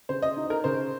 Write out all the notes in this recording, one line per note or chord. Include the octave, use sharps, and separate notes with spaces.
C#3 C5
D#5
D#4
A#4
C#3 C5